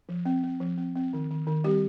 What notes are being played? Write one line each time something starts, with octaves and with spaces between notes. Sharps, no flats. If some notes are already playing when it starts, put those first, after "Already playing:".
F3
C4
C4
F3
C4
C4
D#3
D#3
D#3
G3 C4 G4